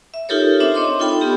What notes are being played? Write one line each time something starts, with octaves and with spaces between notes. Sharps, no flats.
E5
D#4 F4 G4 A4 A#4 C#5
C4 D4 C5 E5
C#5 D#5 C6 D6
D#4 F4 A4 G5 B5 C6
B3 G4